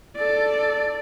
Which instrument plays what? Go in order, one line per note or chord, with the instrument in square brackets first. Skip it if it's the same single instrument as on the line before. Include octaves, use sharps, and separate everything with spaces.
[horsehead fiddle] A4 D5